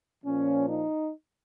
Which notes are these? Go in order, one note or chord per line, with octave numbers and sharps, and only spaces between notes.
A#2 F3 C#4
D#4